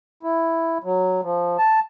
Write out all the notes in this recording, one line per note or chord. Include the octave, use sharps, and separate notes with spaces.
E4
F#3
F3
A5